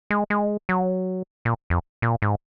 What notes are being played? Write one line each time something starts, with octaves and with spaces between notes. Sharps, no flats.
G#3
G#3
F#3
A#2
F2
A#2
G#2